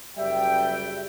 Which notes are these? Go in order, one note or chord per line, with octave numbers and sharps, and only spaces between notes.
F#1 G3 E5 G5